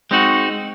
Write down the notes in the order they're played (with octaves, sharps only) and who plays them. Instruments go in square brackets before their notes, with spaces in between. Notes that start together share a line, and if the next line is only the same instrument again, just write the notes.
[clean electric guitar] G#3 C4 D#4 F#4